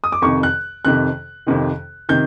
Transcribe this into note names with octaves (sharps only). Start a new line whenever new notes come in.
D#6
D6
F2 C3 D#3 C#6
F#6
F2 C3 D#3 F#6
F2 C3 D#3
C3 D#3 G6